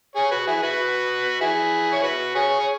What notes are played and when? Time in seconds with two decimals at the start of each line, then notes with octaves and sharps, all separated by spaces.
0.16 G#4 C#5
0.31 F#4 B4
0.47 E4 G#4
0.63 F#4 B4
1.41 E4 G#4
1.93 C#5
2.03 F#4 B4
2.35 G#4 C#5
2.60 C#5